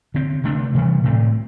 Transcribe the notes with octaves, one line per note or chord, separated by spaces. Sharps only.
D3 C4
C3 A3 D4
C3 E3 G3
A2 A3 C4